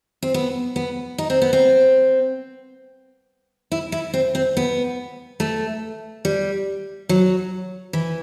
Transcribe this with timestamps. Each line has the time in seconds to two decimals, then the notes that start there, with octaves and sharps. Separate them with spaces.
0.23 C4
0.34 B3
0.76 B3
1.18 D#4
1.30 C4
1.42 B3
1.53 C4
3.72 E4
3.92 E4
4.14 C4
4.35 C4
4.57 B3
5.40 A3
6.25 G3
7.09 F#3
7.93 E3